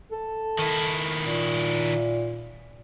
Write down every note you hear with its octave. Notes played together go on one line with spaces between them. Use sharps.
A4
D#3 E4
A#2